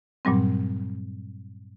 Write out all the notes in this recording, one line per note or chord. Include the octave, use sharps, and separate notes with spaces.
G2 A#2 F#3 G3 C4